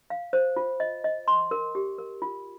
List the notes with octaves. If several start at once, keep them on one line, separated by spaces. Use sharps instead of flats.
F5
C5
F4
D#5
D#5
C6
A#4
G4
A#4
F4